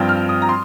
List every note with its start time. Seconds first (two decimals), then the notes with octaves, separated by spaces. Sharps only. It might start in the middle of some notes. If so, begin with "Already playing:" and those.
Already playing: G2 F3 C4 G5
0.09 F6
0.29 D#6
0.42 A#5
0.49 C6